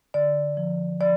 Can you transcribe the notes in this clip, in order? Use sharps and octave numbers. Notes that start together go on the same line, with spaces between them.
D3 D5
F3
F3 D5